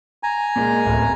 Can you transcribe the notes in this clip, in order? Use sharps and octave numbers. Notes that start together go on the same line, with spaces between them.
G#5 A#5
A#2 G#3 A#3
D1 A1 A2